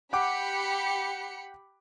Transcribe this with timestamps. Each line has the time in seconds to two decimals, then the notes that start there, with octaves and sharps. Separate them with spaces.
0.13 G4 F#5 G5 B5 D6 C#7